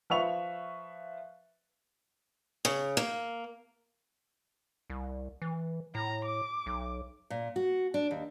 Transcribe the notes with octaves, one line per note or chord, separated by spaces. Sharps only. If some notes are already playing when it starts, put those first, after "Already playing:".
F3 B4 E5 C#6 F7
C#3
A#3
C2
E3
A2 A#5
D6
B1
A#2
F#4
D4
D#2